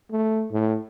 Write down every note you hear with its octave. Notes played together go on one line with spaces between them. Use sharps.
A3
A2